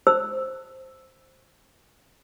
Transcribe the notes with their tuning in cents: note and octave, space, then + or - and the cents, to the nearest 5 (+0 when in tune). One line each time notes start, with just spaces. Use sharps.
C5 +5 E6 +0